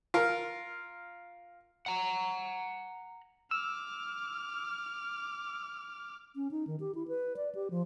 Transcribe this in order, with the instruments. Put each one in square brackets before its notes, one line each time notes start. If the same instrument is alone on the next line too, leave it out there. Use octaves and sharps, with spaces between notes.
[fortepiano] F4 A#4
[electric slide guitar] F#5 A#5
[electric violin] D6 F6 [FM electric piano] E6
[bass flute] C#4
D#4
D#3
G4
E4
B4
D5
G4
F3